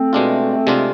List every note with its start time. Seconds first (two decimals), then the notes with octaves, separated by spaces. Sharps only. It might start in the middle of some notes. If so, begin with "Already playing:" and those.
Already playing: A3 C4
0.13 B2 G#3 D4 F4
0.67 C3 G#3 D4 F4